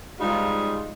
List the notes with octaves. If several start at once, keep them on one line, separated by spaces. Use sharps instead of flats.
G#2 G3 G#3 D#4 F4